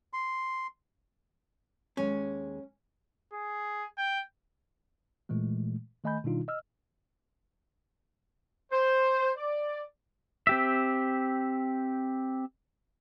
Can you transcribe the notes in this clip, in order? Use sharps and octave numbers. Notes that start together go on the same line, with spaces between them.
C6
D#2 G#3 C#4
G#4
G5
A#2 E3 G#3 A3
D#3 A3 D#5 G#5 B5 G6
B2 D#3 G3 D4 D#4 F4
D#5 E6 F6
C5
D5
C4 G4 E5